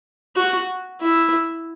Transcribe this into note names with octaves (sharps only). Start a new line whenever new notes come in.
F#4
E4